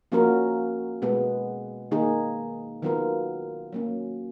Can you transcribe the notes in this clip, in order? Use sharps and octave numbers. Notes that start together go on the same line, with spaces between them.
F3 A#3 C#4 F#4 A#4
B2 G#3 B3
D#3 A#3 D#4 G#4
D#3 F#3 B3 F4 A#4
F#3 A#3 C#4